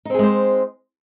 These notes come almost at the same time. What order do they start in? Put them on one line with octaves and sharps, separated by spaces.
D#4 C4 G#4 G#3 C5